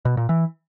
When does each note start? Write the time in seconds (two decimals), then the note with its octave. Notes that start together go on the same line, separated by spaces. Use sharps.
0.05 B2
0.17 A#2
0.29 E3